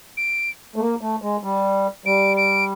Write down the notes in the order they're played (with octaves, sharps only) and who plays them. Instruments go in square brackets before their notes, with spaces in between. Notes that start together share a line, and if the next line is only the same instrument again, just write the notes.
[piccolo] D7
[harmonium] A3
A#3
A3
G#3
G3
[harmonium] G3 [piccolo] D7
[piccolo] D7